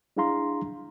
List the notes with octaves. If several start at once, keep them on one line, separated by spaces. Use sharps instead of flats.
D4 E4 G#4 F5 A#5 C6